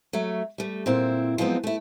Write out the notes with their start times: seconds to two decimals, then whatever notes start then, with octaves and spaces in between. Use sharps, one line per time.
0.13 F#3 A3
0.58 G3 A3
0.86 A#2 C4 E4
1.38 F3 F#3 G#3 B3 C4
1.64 A3 E4